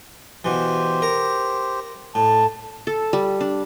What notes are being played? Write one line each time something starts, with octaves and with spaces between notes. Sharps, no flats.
B2 E3 G4 C5
A#4 A#5
A2 A5
A4
G3
D4